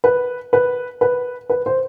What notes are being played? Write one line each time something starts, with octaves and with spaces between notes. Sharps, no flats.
B4
B4
B4
B4
C5